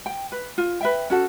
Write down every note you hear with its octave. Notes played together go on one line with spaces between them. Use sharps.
G5
B4
F4
B4 E5 G5
C#4 F#4 A4